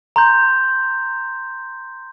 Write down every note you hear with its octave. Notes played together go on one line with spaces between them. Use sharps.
A#5 C6 G6